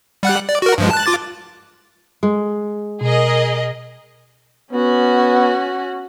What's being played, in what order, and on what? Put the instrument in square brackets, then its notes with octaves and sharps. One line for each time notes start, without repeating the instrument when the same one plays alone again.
[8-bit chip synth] G3 F#5 F#6
D5
F#4 A#4
G2 F3 G#3
A5 F#6
F4 D6 A6
[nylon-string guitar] G#3
[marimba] B2 [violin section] G#4 A#4 D#5
[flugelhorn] B3 [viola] C#4 F#4